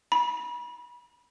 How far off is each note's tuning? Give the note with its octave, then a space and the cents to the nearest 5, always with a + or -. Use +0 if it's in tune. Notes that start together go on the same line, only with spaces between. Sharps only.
B5 -35